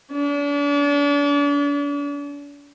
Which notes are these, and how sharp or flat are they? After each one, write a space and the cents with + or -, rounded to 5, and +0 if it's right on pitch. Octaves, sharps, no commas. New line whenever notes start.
D4 -40